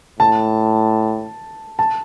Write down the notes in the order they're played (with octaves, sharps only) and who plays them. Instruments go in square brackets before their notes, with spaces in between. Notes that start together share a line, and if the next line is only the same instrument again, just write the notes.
[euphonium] A2 [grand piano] A5
[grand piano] A5